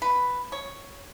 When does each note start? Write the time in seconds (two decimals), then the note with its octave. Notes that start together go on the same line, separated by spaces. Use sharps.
0.02 B4
0.52 C#5